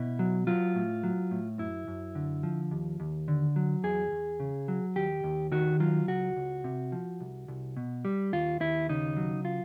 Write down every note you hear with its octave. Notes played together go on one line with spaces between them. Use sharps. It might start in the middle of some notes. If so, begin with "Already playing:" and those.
Already playing: B2 E4
F#3
F#3 F4
A2
F#3
A2
F#2 E4
F#2
D3
F3
D#2
D#2
D3
F#3
E2 G#4
E2
C#3
F#3
D#2 G4
D#2
D#3 F#4
F#3 F4
C#2 F#4
C#2
C3
F3
C2
C2
B2
G3
D#2 F4
D#2 E4
C#3 D#4
F#3
F4